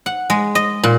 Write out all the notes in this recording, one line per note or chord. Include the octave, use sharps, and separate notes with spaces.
F#5
G#3
D#5
A#2